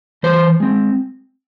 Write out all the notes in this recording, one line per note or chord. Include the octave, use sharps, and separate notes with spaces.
E3 C5
G#3 C4